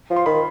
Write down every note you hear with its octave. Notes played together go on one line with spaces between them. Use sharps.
F3
C6
D#3 B5